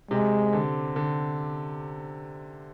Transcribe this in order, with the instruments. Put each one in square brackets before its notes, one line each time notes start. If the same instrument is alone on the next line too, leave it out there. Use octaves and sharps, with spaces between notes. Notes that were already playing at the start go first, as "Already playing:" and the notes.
[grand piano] C3 [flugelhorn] G#3
[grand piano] D3
D3